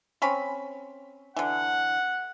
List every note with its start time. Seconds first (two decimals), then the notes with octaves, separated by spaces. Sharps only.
0.22 C4 C#4 B5
1.36 D3 E3 F#5